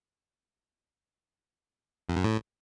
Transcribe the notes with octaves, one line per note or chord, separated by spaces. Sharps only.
F2
F#2
A2